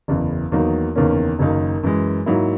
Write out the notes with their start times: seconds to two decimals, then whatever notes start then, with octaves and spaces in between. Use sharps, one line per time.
0.08 F#1 E2 C#3 E3
0.52 E2 D#3 F#3 A#3 D#4
0.96 F#1 E2 D#3 A#3 C#4
1.39 F#1 F#2 D#3 A#3 D#4
1.83 F#2 E3 G#3
2.26 G#2 F#3 A#3 E4